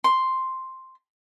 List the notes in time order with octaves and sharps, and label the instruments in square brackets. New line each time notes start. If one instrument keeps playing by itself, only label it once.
[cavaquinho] C6